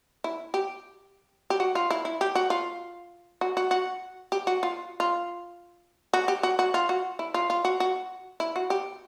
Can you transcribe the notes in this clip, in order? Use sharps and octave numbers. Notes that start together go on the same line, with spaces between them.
E4
G4
G4
F#4
F4
E4
E4
G4
F#4
F4
F#4
F#4
F#4
G4
F#4
F4
F4
F#4
G4
F#4
F#4
F4
F#4
E4
F4
F4
F#4
F#4
E4
F#4
G4